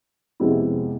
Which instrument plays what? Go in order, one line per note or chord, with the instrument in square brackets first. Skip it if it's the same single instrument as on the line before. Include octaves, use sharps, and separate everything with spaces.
[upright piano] F2 C3 G#3 B3 E4